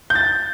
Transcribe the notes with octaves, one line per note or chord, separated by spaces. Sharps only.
G6
A6